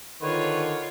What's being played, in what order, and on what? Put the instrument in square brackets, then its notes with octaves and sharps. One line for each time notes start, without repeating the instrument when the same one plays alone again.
[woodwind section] D3 [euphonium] D#3 [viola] F4 C#5 [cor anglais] B4